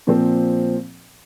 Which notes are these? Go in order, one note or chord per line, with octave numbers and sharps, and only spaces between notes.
A#2 F3 C4